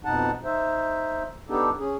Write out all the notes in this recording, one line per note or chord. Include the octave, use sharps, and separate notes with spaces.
F2 B2 D#4 F#5 A5
D#4 C5 E5
B3 D4 D#4 G4 A4
C#4 G#4